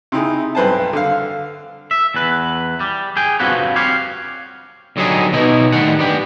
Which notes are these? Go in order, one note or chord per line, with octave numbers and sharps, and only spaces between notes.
C3 D#4 E4 G#4
B1 G2 B4 C5 G#5 A5
D3 F5
E5
E2 B4
G3
G#4 G5
G2 C4 F4 F#4 B4 C#5
G4 C#5 F5
D3 F#3 G3 D4 D#4 G#4
B2 B3 D#4 E4
A2 D#3 G3 F#5
B3 D4 G4